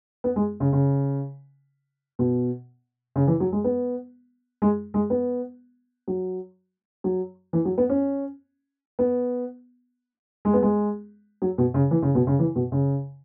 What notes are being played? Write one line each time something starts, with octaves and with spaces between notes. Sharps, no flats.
B3
G#3
C#3
C#3
B2
C#3
E3
F#3
G#3
B3
G#3
G#3
B3
F#3
F#3
E3
F#3
B3
C#4
B3
G#3
B3
G#3
F#3
B2
C#3
E3
C#3
B2
C#3
E3
B2
C#3